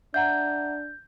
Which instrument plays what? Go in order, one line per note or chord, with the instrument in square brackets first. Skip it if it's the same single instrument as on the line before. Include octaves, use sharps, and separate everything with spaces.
[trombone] D4 [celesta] E5 F#5 A#5 [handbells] G6